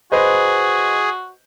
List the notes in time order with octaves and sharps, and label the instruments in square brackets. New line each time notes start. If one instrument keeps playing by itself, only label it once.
[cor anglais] F#4 [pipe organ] G#4 [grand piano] B4 C5 D#5